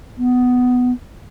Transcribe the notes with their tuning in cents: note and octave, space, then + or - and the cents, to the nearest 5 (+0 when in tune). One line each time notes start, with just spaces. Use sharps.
B3 +10